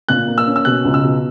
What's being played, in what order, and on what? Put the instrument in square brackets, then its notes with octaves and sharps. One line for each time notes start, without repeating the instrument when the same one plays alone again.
[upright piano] A#2 F#6
A#3
E6
C#4
E6
B2 F#6
C#2
E6
B2